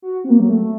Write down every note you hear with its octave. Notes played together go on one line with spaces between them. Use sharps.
F#4
C4
A#3
F#3
A3